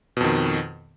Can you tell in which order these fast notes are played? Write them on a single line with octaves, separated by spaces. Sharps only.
B2 F2 D#3